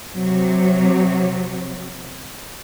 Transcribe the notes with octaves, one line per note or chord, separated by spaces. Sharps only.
C3 F#3